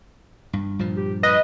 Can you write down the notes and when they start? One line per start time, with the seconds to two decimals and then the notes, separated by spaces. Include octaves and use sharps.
0.53 G2
0.79 G2 A#2 F3
0.97 G4
1.23 B4 D#5